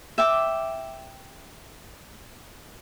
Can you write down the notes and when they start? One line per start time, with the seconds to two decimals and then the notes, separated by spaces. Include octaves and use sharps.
0.18 E5 G5 D6